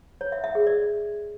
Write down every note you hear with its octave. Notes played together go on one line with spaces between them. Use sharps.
C#5
E5
E5
G#4
D5